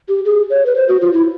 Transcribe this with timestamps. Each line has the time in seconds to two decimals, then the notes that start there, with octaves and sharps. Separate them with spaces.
0.08 G4
0.25 G#4
0.50 C#5
0.66 B4
0.76 C5
0.88 F#4
1.01 F4
1.13 E4